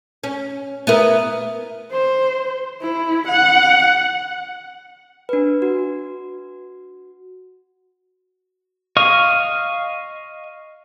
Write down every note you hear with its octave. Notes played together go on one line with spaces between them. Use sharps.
C#4
B3 E4 A#4
C5
E4
F#5
D4 B4
F#4
D#5 F5 C#6